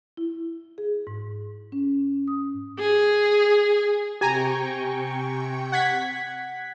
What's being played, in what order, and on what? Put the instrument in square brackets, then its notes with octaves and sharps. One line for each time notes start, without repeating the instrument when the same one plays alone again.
[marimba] E4
G#4
G#2
C#4
D#6
[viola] G#4
[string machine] C3 G5 C#6 [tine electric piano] G4 [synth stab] G#5 A#5
[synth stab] F#5 G#6 B6